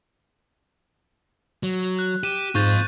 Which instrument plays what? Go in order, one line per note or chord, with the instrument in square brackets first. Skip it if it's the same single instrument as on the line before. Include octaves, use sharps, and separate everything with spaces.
[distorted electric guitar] F#3
[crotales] F#6
[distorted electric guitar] G4 [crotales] D#7 E7
[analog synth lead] G#2 [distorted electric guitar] C4 F4 [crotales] C#6 G6 A6